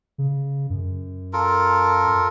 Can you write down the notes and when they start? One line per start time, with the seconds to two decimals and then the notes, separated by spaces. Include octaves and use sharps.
0.18 C#3
0.70 F#2
1.33 F4 A4 A#4